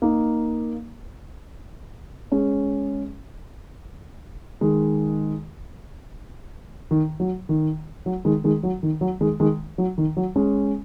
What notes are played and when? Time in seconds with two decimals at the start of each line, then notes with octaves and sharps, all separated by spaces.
0.02 A#3 D#4
2.32 G#3 C#4
4.61 D#3 G#3
6.91 D#3
7.20 F#3
7.49 D#3
8.06 F#3
8.25 D#3 G#3
8.44 D#3 G#3
8.63 F#3
8.83 D#3
9.01 F#3
9.21 D#3 G#3
9.40 D#3 G#3
9.78 F#3
9.98 D#3
10.17 F#3
10.36 G#3 C#4